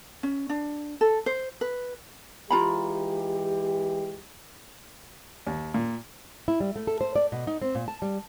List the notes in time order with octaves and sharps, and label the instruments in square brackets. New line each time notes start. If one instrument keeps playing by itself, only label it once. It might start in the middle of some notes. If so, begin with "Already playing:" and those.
[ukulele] C#4
D4
A4
C5
B4
[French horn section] E3 G#3 G4 [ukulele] F4 A#5 B5
[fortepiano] D#2
A#2
[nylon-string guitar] E4
G3
A3
A4
C5
D5
B2
D#4
C4
A#2
A5
G3